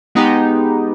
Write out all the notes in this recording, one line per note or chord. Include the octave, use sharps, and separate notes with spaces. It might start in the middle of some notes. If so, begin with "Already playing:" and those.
G#3 B3 D#4 G4